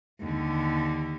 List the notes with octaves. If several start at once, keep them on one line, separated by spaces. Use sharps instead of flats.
D#2 D3